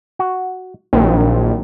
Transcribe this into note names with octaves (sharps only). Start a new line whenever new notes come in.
F#4
A#1 D#3 F#3 C4